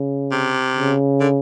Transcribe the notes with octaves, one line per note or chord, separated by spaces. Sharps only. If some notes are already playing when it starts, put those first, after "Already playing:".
Already playing: C#3
C3
C#3
D3